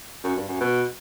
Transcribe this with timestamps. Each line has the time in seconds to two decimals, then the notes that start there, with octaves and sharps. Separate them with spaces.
0.24 F#2
0.36 G2
0.48 F#2
0.60 B2